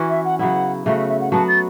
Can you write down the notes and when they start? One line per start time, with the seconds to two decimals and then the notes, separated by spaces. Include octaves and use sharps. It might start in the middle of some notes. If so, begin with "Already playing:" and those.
Already playing: E3 C#4 F#4
0.09 E5
0.24 F#5
0.39 C#3 F#3 B3 E4 F#5
0.85 C#3 A3 F#4 E5
0.97 E5
1.08 E5
1.20 F#5
1.32 F#3 B3 F#4 A5
1.48 A6